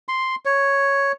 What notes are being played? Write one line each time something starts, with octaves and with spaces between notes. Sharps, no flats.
C6
C#5